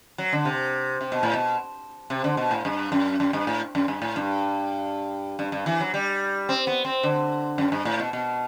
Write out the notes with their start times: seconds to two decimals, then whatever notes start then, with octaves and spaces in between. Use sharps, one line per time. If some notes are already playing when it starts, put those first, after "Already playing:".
0.18 F#3
0.33 D3
0.45 C3
1.01 C3
1.12 B2
1.23 A2
1.34 B2
2.10 C3
2.24 D3
2.37 B2
2.51 A2
2.65 G2
2.92 F#2
3.20 F#2
3.33 G2
3.47 A2
3.75 F#2
3.88 G2
4.02 A2
4.16 G2
5.39 G2
5.52 G2
5.66 E3
5.80 F#3
5.94 G3
6.49 C4
6.67 B3
6.85 C4
7.03 D3
7.58 F#2
7.72 G2
7.85 A2
8.00 B2
8.13 B2